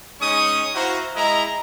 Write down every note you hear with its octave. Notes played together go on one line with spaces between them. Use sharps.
G#3 C#4 D#4 C#6 D#6
E4 F#4 C5 F5 A#5
G#3 E4 D#5 A#5